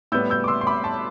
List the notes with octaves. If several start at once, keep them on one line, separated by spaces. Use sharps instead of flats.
A2 G3 B3 E6 G6
E6 G6
D6
C6 E6
C6
B5 D6
A5 C6